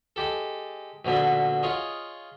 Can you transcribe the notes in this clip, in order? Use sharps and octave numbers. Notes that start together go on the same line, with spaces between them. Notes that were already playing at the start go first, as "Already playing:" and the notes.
G#3 G4 A4
A#1 B2 D3 B3
F4 G#4 C#5 D#5